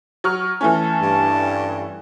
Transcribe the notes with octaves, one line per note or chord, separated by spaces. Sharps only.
F#3 C#6 F6
E3 A3 C#4 A5
G2